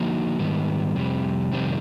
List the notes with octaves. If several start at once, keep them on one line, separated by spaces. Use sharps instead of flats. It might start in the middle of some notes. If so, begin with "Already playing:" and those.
Already playing: D3 F3 A#3 D#4 F#4
G#2 D#3 G3 B3
F2 C3 G3
F2 C3 D#3 G3 C4